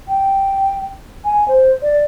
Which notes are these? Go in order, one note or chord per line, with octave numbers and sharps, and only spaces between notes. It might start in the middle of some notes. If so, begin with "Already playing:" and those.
G5
G#5
C5
D5